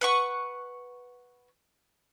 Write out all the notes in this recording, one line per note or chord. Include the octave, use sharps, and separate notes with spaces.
B4 F#5 C#6